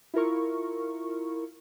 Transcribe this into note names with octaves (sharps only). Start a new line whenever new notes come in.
E4 F4 A#4 C#6